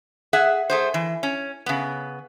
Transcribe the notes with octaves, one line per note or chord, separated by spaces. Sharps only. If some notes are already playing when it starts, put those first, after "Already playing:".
G#4 E5 F#5
A3 G#4 C5
E3
C#4
C#3 B3